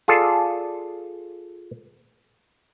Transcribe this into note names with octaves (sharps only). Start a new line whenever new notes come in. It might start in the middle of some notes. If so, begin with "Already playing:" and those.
F4 G#4 A4 D5